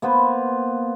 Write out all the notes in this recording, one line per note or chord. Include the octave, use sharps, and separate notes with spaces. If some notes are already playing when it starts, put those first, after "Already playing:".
A#3 B3 B4 C5